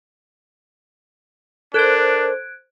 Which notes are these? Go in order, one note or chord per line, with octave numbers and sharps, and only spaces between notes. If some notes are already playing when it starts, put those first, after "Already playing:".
D4 A4 A#4 C5 F#6 G#6 D7